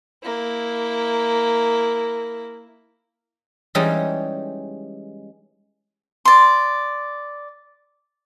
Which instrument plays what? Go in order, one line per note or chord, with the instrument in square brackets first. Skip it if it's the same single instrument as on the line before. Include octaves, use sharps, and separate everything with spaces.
[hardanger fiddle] A#3 E4
[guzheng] E3 G3 G#3 C#4 D#4 G#4
[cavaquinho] D5 C6